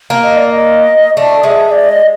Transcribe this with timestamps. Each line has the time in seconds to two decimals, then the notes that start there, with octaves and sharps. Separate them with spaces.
0.10 A#3
0.23 D#5
0.37 D5
0.50 D#5
1.17 A3 D5
1.43 G#3 E5
1.71 D5
1.89 D#5